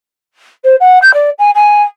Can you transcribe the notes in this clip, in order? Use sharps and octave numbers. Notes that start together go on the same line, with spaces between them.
C5
F#5
G6
D5
G#5
G#5